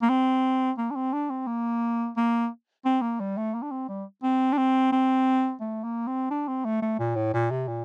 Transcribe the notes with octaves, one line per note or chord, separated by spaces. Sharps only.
A#3
C4
A#3
D4
C4
D4
C4
A#3
A#3
C4
A#3
G3
A3
A#3
D4
C4
G3
C4
D4
C4
C4
A3
A#3
C4
D4
C4
A3
A3
A#2
A2
A#2
C3
A#2